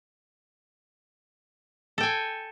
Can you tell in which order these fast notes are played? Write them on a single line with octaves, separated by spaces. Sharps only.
A4 G5 G#5